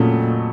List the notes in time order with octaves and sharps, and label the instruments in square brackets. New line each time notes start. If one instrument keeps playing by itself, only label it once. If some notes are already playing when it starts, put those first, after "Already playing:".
Already playing: [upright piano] F2 C#3 F#3 A3 [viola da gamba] A#2